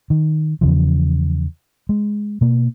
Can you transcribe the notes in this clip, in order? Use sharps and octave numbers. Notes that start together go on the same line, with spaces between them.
D#3
E2 C#3 F3
G#3
B2 A#3